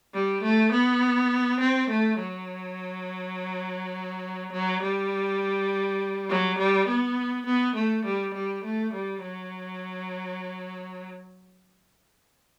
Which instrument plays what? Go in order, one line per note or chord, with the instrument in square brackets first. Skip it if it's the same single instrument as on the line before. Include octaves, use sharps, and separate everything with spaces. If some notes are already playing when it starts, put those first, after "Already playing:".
[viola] G3
A3
B3
C4
A3
F#3
F#3
G3
F#3
G3
B3
B3
A3
G3
G3
A3
G3
F#3